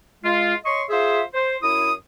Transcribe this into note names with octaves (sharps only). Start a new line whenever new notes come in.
G#3 F4
C#5 D#5 C6 C#6
F4 G#4 C5 E5
C5
F#2 E4 D#6